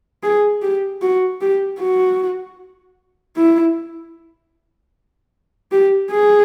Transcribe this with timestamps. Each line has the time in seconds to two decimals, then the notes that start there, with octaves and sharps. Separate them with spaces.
0.23 G#4
0.62 G4
1.02 F#4
1.41 G4
1.80 F#4
3.36 E4
5.72 G4
6.11 G#4